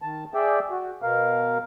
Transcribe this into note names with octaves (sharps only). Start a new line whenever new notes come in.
D#3 A5
G#4 D5 E5 G5
F#4
B2 A#4 F5